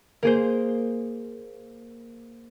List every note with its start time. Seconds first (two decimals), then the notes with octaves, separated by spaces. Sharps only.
0.23 A#3 G#4 C5